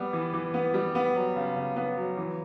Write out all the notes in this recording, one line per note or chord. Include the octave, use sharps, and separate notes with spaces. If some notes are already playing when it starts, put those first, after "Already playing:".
Already playing: G3 B3
E3
E3
B3
G3
B3
F#3
C#3
C#3
B3
F#3
E3